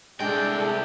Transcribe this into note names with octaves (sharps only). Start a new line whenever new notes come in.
C2 G#3 D4 G#4 A4 G5